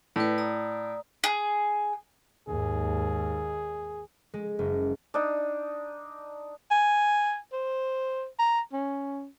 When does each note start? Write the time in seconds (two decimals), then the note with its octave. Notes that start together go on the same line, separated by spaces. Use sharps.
0.16 A2 B4 D5
0.38 D5 A#5 D#6
1.24 G#4
2.48 D#2 G#2 G#4
4.34 G#3
4.59 F#1
5.14 D4 D#4
6.71 G#5
7.53 C5
8.39 A#5
8.73 C#4